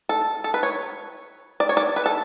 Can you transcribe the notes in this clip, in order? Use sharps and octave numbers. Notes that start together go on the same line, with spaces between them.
A4
A4
B4
C#5
D5
C#5
D5
B4
A4